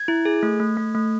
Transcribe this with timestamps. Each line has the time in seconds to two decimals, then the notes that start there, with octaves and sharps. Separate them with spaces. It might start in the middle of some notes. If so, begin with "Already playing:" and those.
Already playing: G#6
0.08 E4
0.25 G#4
0.43 A3
0.60 A3
0.77 A3
0.95 A3